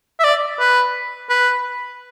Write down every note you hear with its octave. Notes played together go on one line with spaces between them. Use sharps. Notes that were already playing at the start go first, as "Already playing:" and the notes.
E5
D5
B4
B4